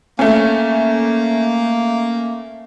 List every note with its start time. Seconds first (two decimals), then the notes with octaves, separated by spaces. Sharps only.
0.19 A3 A#3 C#4